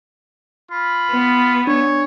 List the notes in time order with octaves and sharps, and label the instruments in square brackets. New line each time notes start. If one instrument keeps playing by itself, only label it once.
[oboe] F4 [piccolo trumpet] B5
[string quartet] B3
[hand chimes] D4 [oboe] C#5